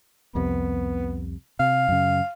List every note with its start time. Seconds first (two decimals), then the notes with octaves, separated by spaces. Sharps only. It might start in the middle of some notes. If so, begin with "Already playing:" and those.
0.35 C2 F2 C3 B3
1.59 C3 F5
1.89 F#2 C#3